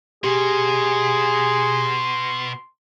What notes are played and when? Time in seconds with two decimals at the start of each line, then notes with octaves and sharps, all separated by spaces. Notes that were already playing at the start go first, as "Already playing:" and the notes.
0.24 B2 G4 G#4 C6